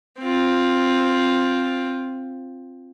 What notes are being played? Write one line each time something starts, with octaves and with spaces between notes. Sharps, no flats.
C4 F4